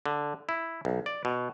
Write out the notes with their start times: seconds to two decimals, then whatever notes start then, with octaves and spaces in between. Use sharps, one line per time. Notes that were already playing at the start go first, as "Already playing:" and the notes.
0.06 D3
0.49 E4
0.85 B1
1.06 D5
1.25 B2